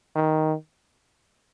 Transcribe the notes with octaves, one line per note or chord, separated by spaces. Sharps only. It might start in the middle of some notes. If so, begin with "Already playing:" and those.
D#3